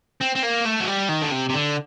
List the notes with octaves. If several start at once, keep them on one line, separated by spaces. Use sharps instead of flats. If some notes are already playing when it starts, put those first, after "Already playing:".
C4
C4
A#3
A3
F#3
G3
D#3
D3
C3
C3
D3